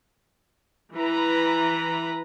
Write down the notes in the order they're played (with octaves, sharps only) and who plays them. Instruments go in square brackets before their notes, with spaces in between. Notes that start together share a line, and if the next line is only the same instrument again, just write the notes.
[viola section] E3 B4 A#5